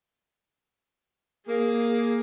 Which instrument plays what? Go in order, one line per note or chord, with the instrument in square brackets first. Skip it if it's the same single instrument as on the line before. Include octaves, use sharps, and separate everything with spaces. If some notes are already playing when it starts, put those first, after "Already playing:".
[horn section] A#3 [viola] G#4